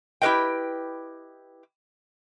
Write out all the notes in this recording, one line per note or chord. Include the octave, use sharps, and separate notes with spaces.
E4 G4 A#4 B4 D#5 G5